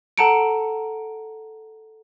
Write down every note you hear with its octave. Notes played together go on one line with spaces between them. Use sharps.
A4 F#5 A5 A#5 C#7 D7